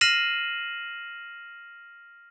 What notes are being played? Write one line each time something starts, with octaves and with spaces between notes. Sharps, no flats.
F6 A#6 C7 D#7 E7 F#7